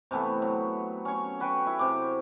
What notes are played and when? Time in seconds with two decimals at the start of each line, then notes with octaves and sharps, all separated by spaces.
0.11 C3 E3 A3 B3
0.42 F#3
1.05 C#4 C#5
1.40 F#4 B4 G5
1.66 E4
1.79 C3 D6